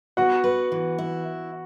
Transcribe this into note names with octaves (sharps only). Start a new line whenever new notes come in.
B3 F#4 F#5
B4
E3
E4